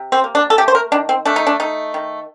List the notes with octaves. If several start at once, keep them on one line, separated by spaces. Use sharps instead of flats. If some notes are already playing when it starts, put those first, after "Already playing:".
Already playing: C3
C4
A#3
D4
A4
A3 G4
C5
A#4
D#3 D4
C4
A3 D4
D#4
D4
A3 D#4
D#3